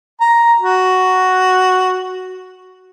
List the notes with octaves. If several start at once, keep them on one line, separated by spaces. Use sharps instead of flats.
A#5
F#4